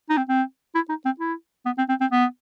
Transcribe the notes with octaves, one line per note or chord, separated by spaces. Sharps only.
D#4
C4
C4
E4
D#4
C4
E4
B3
C4
C4
C4
B3